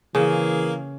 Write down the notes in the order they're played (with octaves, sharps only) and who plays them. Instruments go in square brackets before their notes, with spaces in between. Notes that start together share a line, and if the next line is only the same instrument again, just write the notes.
[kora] C#3 [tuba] E3 [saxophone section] A#3 G#4